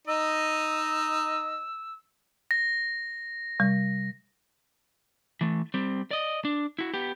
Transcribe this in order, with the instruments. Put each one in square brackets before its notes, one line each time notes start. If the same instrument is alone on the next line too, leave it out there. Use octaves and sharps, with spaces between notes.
[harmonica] D#4 D#5 [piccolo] E6
[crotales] A#6
[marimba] C3 G3
[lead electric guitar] E3 A3
G3 C4
D5 D#5
D4
E4 F#4
B3 G4